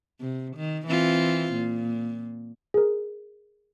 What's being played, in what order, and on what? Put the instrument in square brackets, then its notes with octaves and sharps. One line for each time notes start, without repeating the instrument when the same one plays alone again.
[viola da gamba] C3
D#3
E3 C4 F4
A#2
[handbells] G#4 A#4